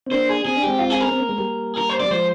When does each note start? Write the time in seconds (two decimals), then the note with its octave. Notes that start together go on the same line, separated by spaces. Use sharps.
0.06 C4
0.11 A#3 D4 C5
0.29 G#4
0.45 C4 G#4
0.56 D4
0.62 G#3 C4 G4
0.79 F4
0.90 G#4
1.00 A#4
1.12 C4
1.20 A#3
1.29 G#3
1.38 G3 A#3
1.74 G#4
1.77 A#4
1.89 C5
2.00 D5
2.06 G3
2.11 F3 G#3 C5